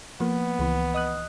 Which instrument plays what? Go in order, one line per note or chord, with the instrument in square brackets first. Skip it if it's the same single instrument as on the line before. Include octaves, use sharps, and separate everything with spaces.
[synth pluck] F3 A#3 [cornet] B3
[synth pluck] C#2 E3
D#5 D#6 F#6